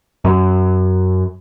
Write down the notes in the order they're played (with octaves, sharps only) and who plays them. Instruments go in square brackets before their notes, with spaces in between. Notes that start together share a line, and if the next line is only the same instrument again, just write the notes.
[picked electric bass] F#2